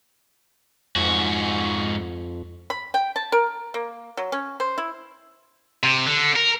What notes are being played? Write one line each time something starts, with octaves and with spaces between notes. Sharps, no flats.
F2 G#2 F#4
B5
G5
A5
A#4
A#3
F#3
C#4
C5
E4
C3
D3
A#4